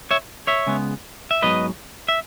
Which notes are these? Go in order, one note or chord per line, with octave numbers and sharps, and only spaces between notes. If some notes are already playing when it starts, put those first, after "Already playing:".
C#5 E5
C#5 E5
C#3 G#3 B3
E5
G#2 F#3 B3 B4 D#5
E5